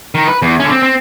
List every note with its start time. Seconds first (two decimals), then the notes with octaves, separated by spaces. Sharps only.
0.15 D#3
0.27 B4
0.42 E2
0.60 D3 C#4
0.71 C4
0.83 C4